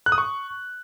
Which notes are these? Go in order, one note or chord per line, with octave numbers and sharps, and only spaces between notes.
F#6
D#6
C#6